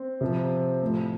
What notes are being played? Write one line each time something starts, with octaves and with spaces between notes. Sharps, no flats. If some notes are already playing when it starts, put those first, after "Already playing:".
Already playing: C4
C3 F3
A2 F3